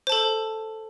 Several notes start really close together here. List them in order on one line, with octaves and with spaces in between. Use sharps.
C5 A5 A4